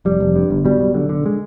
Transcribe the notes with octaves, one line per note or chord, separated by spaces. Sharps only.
F1 G3
F1
G2
G1
B2 G3
B1
D3
D3
G#3